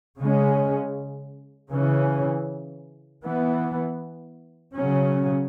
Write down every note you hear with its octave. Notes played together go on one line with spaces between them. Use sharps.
C#3 G#3 C#4
C#3 E3 C#4
E3 B3
C#3 F#3 C#4